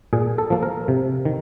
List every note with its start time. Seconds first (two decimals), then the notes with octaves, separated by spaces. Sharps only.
0.13 A#2 G#4
0.38 A4
0.50 F3 A#3
0.63 A#4
0.88 C3
1.25 D#3